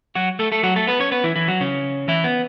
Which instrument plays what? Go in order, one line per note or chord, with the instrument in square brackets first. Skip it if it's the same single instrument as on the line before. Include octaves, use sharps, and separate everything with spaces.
[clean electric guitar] F#3 F#4
A3 A4
A3 A4
F#3 F#4
A3 A4
B3 B4
C#4 C#5
B3 B4
E3 E4
E3 E4
F#3 F#4
C#3 C#4
E3 E4
B3